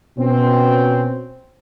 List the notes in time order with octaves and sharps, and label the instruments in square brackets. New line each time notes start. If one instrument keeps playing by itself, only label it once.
[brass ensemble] B2 C4 C#4